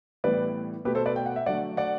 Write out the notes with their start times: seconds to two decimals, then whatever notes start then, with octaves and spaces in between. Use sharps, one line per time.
0.24 A2 E3 G3 B3 B4 D5
0.85 B2 A3 G4 B4
0.95 A4 C5
1.06 B4 D5
1.16 G5
1.26 F#5
1.36 E5
1.46 D3 F#3 A3 D5 F#5
1.77 D5 F#5